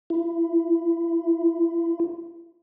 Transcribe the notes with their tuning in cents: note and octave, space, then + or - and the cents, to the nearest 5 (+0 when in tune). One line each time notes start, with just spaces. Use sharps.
E4 +30